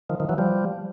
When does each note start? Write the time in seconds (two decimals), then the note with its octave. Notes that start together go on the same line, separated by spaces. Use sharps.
0.10 D#3 F3
0.20 D#3 F3
0.29 E3 F#3
0.38 F3 G3